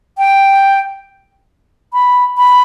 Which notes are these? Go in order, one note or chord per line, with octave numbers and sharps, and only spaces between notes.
G5
B5
B5